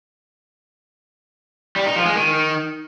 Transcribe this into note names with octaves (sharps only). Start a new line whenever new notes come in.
G3
D#4
F3
G#3
D#3